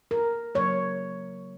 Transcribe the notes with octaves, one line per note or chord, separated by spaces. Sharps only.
A#4
C#3 F#3 A#3 C#5